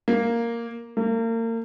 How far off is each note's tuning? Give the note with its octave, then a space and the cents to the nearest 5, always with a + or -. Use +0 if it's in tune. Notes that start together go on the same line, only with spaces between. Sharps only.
A#3 +0
A#3 -35